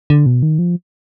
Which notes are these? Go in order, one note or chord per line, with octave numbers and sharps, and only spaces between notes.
D3
B2
D#3
F3